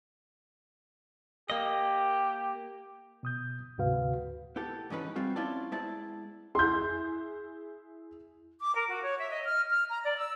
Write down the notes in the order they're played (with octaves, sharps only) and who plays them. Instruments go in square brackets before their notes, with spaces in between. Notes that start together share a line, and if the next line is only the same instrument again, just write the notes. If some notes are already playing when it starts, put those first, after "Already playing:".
[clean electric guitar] A#3 D#5 [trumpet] G4
[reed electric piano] B2 D#6 G6
D2 G#2 C3 F#4 B4 F5
[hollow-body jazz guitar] B3 E4 G4 A4
G#2 E3 C#4 D#4 A4 B4
G3 C4 F4 F#4
C4 C#4 E4 F4 D5 A5
G#3 B3 E4 C5 D5 A5
[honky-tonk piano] E4 G#4 [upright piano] C6 G6
[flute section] D6
A#4
F#4
C#5
E5
D#5
F6
F6
A#5
D5
E6